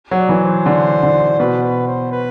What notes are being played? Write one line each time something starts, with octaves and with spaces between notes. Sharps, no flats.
F#3
D5
E3
C5
D3
D3
B2 B4
B4
C5
B4